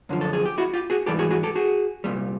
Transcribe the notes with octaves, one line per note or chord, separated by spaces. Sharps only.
F#2 D3 F3
A4
G#4
G4
E4 F#4
F4 G4
F#4 G#4
G#2 E3 G3 G4 A4
F#4 G#4
F#4 G#4
G4 A4
F#4 G#4
C2 A#2 G3